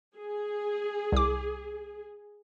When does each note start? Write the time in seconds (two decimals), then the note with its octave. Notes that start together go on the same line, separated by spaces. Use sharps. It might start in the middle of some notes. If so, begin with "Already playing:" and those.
0.16 G#4
1.12 C2 D6